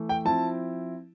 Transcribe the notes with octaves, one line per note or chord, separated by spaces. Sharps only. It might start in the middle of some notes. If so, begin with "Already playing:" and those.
Already playing: E3 A3
G5
F3 C4 E4 A5